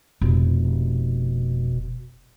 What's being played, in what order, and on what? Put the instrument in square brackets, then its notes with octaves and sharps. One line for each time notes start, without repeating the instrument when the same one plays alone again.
[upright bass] F1 [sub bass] B2